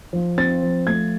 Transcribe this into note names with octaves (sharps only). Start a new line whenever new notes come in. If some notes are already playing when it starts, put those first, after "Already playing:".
F3
C4 A6
F3
A3 G#6